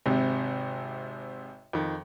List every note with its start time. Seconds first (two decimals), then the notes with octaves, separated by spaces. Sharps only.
0.06 G#1 C3
1.73 F2 D#3